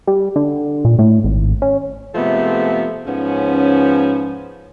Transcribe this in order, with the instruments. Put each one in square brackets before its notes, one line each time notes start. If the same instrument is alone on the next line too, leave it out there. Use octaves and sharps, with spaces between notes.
[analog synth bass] G3
D3
A#2
A2
G#1
C#4
[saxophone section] C3 F3 G#3 A3 B3 A4
G#2 F3 B3 C#4